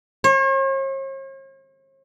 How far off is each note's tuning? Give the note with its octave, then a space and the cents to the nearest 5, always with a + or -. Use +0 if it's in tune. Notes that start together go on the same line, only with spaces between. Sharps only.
C#5 -45